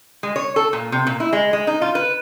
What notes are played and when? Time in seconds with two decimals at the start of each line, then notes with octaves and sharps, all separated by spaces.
0.23 G#3
0.36 C#5
0.56 A4
0.73 A#2
0.92 C3
1.07 A#2
1.20 E4
1.33 G#3
1.53 G#3
1.67 D#4
1.82 F4
1.95 B4